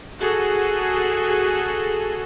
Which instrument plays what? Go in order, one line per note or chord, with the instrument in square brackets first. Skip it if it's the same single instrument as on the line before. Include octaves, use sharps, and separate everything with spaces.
[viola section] F#4 G#4 A4